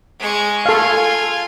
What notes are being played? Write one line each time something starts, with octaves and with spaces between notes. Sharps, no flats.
G#3 C#6
F4 A4 F5 G#5